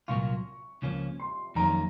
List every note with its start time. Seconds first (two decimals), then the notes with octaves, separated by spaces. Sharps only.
0.08 C2 A#2 F#3 A#3 F4 C#6
0.82 C#2 C#3 F3 A#3 C#4
1.20 C6
1.55 F2 D#3 F#3 A#3 C#4 A#5